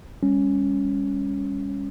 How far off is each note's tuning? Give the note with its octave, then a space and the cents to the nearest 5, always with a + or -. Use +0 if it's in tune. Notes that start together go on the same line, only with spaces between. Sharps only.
G3 +40 C#4 +0